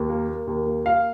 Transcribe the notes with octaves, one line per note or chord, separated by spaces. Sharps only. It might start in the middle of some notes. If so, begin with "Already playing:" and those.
Already playing: D#2
A#3
A#3
D#2
A#3
A#3 F5